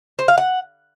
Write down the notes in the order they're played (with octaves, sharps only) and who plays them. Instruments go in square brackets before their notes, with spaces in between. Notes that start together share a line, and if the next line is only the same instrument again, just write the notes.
[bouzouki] C5
F5
F#5